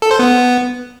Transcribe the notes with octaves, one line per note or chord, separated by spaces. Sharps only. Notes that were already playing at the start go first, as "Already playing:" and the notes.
A4
C5
B3